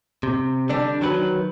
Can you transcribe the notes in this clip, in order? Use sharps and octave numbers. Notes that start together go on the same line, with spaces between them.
C3
D3 G3 D4
D#3 F#3 B4